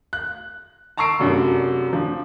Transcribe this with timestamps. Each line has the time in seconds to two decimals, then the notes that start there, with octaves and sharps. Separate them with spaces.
0.13 F#6
0.97 A5 A#5 C#6 E6 C7 D7
1.20 F1 F#2 D4
1.93 F3 D4